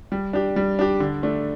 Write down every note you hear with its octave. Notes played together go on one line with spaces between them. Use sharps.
G3
D4 G4
G3
D4 G4
D3
A3 D4